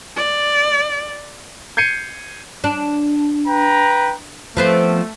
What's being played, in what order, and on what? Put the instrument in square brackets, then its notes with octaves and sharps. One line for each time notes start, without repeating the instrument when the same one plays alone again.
[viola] D5
[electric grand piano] G6 G#6 C7 C#7 D#7
[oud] D4
[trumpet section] B4 G5 A#5
[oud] F3 B3 C4 [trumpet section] A3